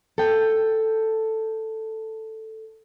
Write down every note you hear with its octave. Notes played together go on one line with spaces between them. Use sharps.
A4 G5